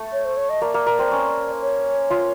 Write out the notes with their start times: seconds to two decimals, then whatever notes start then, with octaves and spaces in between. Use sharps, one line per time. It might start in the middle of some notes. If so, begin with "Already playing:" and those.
Already playing: A3
0.12 C#5
0.25 C5
0.37 C#5
0.49 D#5
0.62 A#3 D5
0.74 A#3
0.86 A#3
0.99 C4
1.12 C#4
1.61 C#5
2.10 F4